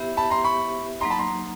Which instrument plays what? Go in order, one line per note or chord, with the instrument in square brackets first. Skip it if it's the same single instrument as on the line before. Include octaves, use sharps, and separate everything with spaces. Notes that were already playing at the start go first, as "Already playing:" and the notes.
Already playing: [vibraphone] B3 E4 G4 C5 E5
[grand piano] A5 B5
A#5 C6
B5 C#6
[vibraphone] F#3 A#3 D#4 [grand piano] A#5 C6
[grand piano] A5 B5
A#5 C6